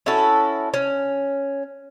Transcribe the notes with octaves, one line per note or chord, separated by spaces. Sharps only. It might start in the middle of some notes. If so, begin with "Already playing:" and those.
C#4 E4 F#4 A4
C#4